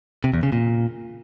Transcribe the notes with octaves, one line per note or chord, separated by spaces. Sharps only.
C3
E2
C#3
A#2